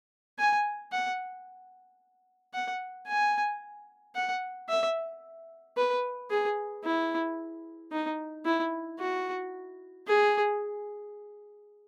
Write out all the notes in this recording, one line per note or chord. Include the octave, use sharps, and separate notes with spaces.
G#5
F#5
F#5
G#5
F#5
E5
B4
G#4
E4
D#4
E4
F#4
G#4